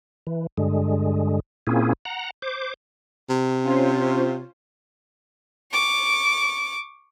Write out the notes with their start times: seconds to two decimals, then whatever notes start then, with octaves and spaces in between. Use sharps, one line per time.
0.27 E3
0.57 G2 D3 G#3
1.67 A#2 A#3 C4 C#4 E4 G#4
2.05 F#5 A#5
2.42 C5 D6
3.29 C3
3.64 C#4 F4 C5
5.71 C#6 D6